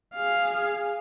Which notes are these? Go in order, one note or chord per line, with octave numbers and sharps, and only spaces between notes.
G#4 F5